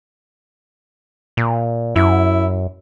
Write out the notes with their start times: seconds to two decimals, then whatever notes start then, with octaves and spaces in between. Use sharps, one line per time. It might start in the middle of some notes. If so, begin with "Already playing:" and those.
1.37 A#2
1.96 F#2 E4